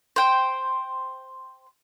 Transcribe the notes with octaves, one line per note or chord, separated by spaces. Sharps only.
C5 G5